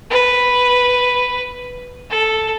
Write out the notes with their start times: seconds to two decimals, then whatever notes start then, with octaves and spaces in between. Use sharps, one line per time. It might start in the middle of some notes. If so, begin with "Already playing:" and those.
0.10 B4
2.10 A4